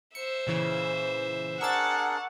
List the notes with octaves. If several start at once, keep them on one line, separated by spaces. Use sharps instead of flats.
C5 E5 C#7
A#2 C#3 E3
D4 G#4 A#4 F#5 C#6 E6 A6